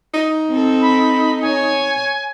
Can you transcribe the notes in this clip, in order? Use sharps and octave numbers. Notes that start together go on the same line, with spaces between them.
D#4
C4 A4
B5
C#5 G#5